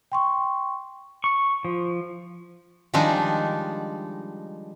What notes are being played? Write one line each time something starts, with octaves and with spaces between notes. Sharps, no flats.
G5 C6 C#6
C#6
F3
D#3 F3 G3 G#3 D4 D#4